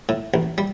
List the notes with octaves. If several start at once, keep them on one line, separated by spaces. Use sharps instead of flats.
A2
A1
G3